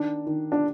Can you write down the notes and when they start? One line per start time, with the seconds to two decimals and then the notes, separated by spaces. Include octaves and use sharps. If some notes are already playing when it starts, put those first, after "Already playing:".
Already playing: D#3 D4
0.27 D#3
0.52 D4